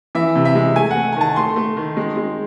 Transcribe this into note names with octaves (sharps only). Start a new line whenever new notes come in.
E3 E5
C3
E5
G#3
A3 G#5
F#5
A3
G#5
D#3 A5
A3 C6
A3
D#3
G#3
G#3